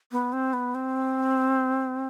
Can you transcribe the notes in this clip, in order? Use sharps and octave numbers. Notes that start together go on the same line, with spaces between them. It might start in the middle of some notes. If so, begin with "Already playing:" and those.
B3
C4
B3
C4